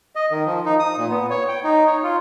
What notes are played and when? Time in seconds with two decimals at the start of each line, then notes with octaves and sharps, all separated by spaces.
0.15 D#5
0.31 D#3
0.46 F3
0.66 D#4
0.80 D#6
0.98 A#2
1.09 B3
1.30 C#5
1.48 G5
1.64 D#4
1.87 C#5
2.03 F4